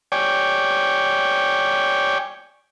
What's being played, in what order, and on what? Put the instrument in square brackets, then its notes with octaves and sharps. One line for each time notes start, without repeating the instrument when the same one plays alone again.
[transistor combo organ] C#5 D5 G5 G#5